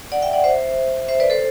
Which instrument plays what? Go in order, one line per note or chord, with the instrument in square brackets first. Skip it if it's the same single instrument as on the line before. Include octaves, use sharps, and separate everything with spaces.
[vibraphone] D5 F#5
E5 G5
D5 F#5
C5 E5
C5 E5
B4 D5
A4 C5